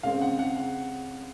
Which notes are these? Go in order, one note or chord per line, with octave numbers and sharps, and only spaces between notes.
C#3 G#3 C4 F5
F#5
F#5
F#5